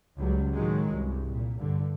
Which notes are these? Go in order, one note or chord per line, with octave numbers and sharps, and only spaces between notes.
C#2 F#3 G3
A2 D#3 F#3 G#3
C2 G2
A#2
G2 D3